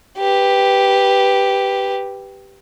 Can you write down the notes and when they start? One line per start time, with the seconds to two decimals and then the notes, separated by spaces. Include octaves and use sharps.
0.18 G4 B4